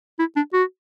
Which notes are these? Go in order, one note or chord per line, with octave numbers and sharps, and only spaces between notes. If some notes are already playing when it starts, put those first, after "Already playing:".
E4
D4
F#4